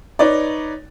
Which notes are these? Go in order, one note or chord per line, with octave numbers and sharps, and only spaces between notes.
D#4 B4 C#5 D5